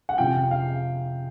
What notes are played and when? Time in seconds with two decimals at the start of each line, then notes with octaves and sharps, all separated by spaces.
0.09 F#5
0.18 F2 C3 F3 F5 G5
0.51 F5